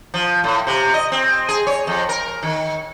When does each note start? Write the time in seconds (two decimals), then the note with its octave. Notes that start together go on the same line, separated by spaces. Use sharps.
0.14 F3
0.44 A2
0.67 C3
0.94 D#5
1.12 C4
1.49 G#4
1.67 C#5
1.87 F2
2.09 A#4
2.43 D#3